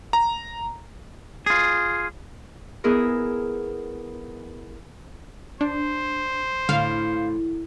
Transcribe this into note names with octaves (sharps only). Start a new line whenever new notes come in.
A#5
F4 G#4
B3 E4 G#4 A#4
D4 C5
A2 D3 F5